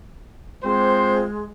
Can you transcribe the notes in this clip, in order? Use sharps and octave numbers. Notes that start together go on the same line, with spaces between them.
G#3 C4 F4 C5